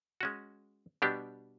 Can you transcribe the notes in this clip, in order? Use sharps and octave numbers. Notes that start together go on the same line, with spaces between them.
G#3 C#4 F#4
B2 G3 B3 D4 G4